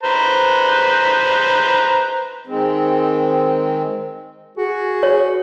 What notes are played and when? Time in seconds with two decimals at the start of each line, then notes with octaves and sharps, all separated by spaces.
0.03 B4 C5 A#5
2.47 D#3 G#3 C4
4.58 F#4 G#4
5.03 C#5